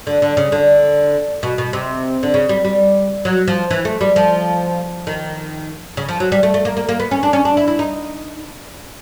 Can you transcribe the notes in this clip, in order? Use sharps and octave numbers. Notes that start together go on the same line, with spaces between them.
D3
D3
C#3
D3
B2
B2
C3
D3
C#3
G3
G3
F#3
F3
E3
A3
G3
F3
D#3
C#3
F3
F#3
G3
A3
A3
A#3
A#3
A#3
B3
C#4
D4
C#4
D4
E4
E4
D#4